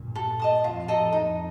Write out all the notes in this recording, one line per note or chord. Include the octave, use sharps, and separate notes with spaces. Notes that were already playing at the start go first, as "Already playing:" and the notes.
Already playing: G2 A#2
A4
D#5 A5 D#6
F2 A2 F4
A4 D#5 A#5
F2 D#4